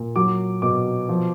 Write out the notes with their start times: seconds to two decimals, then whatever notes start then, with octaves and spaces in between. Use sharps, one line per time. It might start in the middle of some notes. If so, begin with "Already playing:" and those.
Already playing: A#2
0.16 F#3 D6
0.62 B2 D6
1.09 F3